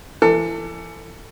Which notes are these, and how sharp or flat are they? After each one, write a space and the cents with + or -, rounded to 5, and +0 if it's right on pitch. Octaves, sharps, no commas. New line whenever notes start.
E3 +25 A4 +25